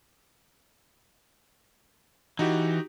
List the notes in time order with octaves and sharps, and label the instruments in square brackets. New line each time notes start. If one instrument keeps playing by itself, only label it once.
[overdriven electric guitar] E3 [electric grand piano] D#4 F#4 G4